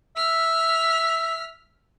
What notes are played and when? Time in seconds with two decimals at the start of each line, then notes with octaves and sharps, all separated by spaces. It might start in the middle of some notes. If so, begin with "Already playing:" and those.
0.17 E5 F6 B6